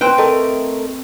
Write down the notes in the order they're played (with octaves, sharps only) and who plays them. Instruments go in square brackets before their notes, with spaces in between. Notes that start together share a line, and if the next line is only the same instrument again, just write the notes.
[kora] C4 B4 G5
[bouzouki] A3 A#4 D#5